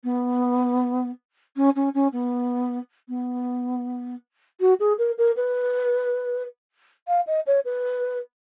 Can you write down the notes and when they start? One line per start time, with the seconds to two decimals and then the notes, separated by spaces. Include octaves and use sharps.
0.04 B3
1.56 C#4
1.76 C#4
1.94 C#4
2.13 B3
3.09 B3
4.60 F#4
4.80 G#4
4.98 A#4
5.18 A#4
5.37 B4
7.08 F5
7.27 D#5
7.47 C#5
7.65 B4